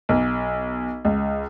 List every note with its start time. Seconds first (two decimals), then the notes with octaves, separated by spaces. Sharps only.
0.09 B1
1.05 C#2